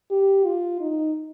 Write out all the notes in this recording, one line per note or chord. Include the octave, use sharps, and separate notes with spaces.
G4
F4
D#4